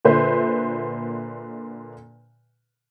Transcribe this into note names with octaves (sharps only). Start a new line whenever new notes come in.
A#2 D3 B4 C5 E5